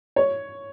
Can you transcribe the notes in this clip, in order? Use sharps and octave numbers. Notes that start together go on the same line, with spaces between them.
C#5